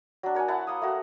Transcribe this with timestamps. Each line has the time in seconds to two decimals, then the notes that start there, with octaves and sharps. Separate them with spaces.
0.23 F#3 D4
0.35 A#4 C#5 F#5 G#5
0.48 E4 F#5 A5
0.67 A#3 D#6
0.82 A3 F#4